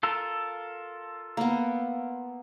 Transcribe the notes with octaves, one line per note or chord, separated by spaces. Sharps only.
F4 A4 A#4
A#3 B3